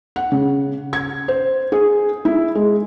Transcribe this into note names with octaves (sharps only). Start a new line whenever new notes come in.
F#5
C#3
G#6
C5
G#4
E4
G#3